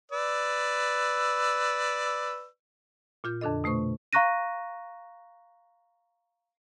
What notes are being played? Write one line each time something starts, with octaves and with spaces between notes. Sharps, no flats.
B4 D5 E6
A#2 F4 G6
F2 D3 D4 A4 D#5
B2 A3 C5 C#6
F5 A#5 C#6 F#6 A#6 D#7